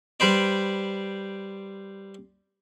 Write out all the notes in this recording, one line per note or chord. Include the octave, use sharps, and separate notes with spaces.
G3 B4 C5 D5